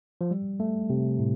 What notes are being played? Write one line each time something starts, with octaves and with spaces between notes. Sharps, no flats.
F3
G3
A3
C3
A2